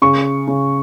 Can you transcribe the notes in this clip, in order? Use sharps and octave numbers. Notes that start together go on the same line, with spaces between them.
C#3 C#6
C#3